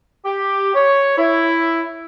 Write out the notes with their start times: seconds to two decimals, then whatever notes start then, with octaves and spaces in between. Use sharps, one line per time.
0.25 G4
0.75 C#5
1.18 E4